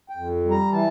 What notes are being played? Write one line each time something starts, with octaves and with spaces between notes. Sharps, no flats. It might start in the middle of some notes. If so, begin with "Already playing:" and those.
G5
F2
G3
A#5
E3 A5